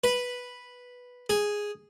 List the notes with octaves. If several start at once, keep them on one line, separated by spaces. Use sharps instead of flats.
B4
G#4